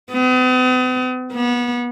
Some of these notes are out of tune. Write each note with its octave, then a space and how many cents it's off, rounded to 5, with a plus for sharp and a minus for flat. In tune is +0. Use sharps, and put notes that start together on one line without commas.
B3 +45
B3 -30